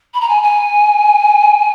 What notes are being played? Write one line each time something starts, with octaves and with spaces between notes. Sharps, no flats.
B5
A#5
G#5
G#5